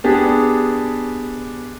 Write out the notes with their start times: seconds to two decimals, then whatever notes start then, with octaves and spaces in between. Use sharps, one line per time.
0.04 B3 D4 G4 G#4